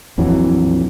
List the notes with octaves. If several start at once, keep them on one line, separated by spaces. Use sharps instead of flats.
A#1 F2 E3 F#3